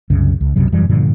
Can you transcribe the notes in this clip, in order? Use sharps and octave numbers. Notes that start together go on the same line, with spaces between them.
C2 F#2 C#3
C#2
B1 F#2 C3 F#3
E1 F#2 E3 G3
G2 A#2 D3 F3